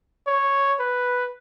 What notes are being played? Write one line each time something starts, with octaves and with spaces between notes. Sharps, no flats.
C#5
B4